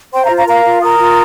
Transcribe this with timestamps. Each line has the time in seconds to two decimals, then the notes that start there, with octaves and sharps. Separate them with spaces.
0.13 C5 G5 C6
0.24 F5 A#5
0.31 F4
0.36 F5 A#5
0.47 A#4 F5 A#5
0.65 F4
0.82 A#4 A#5 D#6
0.99 F4